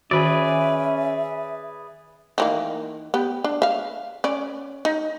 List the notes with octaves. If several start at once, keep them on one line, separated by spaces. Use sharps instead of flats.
D#3 C#4 F#4 G#4 B4 D5 E5
D#3 E3 A#3
B3 G4
D4
E5 F5
C#4 D5
D#4